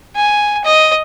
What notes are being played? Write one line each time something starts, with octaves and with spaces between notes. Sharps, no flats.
G#5
D#5